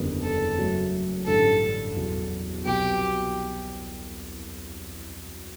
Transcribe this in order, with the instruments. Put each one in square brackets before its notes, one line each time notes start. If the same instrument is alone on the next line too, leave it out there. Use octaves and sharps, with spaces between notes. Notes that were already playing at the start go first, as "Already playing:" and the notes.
Already playing: [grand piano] F#1 E2 D3 G3 B3
[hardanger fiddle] A4
[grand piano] F#1 F#2 F#3 A3
[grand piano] A1 G2 D3 [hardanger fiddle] A4
[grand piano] E2 B2 F#3
[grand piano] C2 B2 F#3 B3 [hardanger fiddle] G4